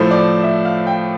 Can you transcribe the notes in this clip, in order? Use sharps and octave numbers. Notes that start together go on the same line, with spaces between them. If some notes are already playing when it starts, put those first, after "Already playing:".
Already playing: A2 F3 A3 C5
D5
E5
F5
G5